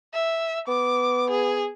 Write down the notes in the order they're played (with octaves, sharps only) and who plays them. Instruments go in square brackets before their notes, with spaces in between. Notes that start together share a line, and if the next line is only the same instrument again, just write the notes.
[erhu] E5
[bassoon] B3 [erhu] D6
[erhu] G#4